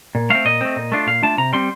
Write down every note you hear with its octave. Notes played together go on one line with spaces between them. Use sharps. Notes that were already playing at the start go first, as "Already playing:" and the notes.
A#2
A3 C4 F5
A#2 D#5
A3 C4
A#2
A3 D4 F4
A#2 F5
A3 D4 F4 A5
C3 A#5
G3 C4 C6